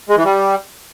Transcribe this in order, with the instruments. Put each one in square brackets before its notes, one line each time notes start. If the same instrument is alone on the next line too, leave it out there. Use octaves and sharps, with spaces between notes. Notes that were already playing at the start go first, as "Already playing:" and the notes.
[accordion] G#3
E3
G3